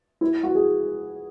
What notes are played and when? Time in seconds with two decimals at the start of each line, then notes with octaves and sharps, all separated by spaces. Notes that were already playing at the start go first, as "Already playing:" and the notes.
0.21 E4
0.43 F#4
0.55 G#4